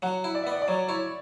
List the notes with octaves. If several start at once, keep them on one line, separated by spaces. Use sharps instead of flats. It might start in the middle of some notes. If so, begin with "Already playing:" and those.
F#3 F#5
E4
D5
E5
B3 D5
D5
F#3 C#5
E4 C#5